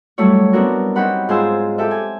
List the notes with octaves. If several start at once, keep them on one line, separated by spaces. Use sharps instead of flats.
F#3 G3 A3 E4 C#5
B3 C4 D4 E4 F#4 A#4
C4 C#4 D#4 G4 F#5 B5
G#2 F4 G#4 C5 G#5 E6
G4 A4 E5
G#5